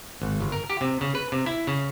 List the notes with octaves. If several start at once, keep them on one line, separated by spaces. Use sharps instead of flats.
G#1
G1
A#4
G4
C3
C#3
B4
C3
E4
C#3